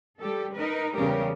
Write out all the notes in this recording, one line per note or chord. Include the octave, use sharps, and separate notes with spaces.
G3 G4 A4
D#4 A#4 B4
E2 C#3 G3 G4 A#4